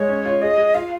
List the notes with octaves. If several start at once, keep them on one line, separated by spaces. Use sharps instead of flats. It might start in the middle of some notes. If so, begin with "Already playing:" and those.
Already playing: G#3 C#5
C#4
F4
G#4 D#5
G#4
F4 F5